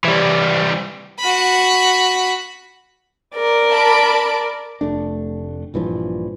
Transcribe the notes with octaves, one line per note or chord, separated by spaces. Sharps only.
E3 G3
F#4 B5
A#4 D5
A5 B5 D7
F1 A3 D4
A#1 G2 E3 F3